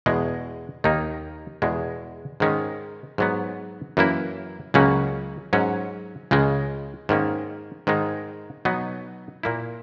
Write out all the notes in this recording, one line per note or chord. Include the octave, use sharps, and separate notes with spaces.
E2 B2 G#3
D#2 D#3 A#3 D#4
E2 B2 G#3
G#2 D#3 G#3 C#4
G#2 F#3 B3
F#2 E3 A#3 E4
C#2 C#3 F#3 A#3 C#4
G#2 F#3 C#4
C#2 C#3 G#3
G#2 D#3 A#3 C#4
G#2 D#3 G#3 D#4
B2 F#3 B3 D#4
A#2 A#3 E4